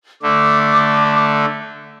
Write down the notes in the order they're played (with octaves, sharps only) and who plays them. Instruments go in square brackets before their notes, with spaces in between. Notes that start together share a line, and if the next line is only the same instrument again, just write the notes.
[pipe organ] D3 A3 [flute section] D6